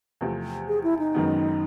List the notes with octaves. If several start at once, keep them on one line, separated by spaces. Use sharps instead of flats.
E2 C3 F3 A3
G#4
E4
D#4
F#1 F#2 D#3 G#3 B3